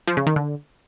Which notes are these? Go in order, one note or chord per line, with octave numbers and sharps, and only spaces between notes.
F3
C#3
D#3
D3